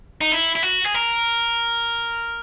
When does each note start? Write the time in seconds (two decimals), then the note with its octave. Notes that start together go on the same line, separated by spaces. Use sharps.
0.21 D#4
0.32 E4
0.55 E4
0.63 F#4
0.85 G#4
0.94 A#4